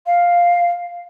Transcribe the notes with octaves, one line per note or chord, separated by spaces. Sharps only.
F5